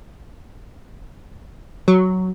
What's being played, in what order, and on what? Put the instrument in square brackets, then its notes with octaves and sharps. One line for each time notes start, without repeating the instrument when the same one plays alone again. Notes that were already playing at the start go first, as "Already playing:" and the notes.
[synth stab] F#3